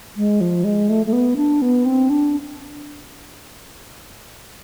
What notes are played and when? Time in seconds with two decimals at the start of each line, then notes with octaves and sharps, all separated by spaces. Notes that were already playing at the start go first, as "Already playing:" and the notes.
0.17 G#3
0.41 F3
0.64 G#3
0.89 A3
1.06 A3
1.13 B3
1.36 D4
1.62 B3
1.85 C4
2.10 D4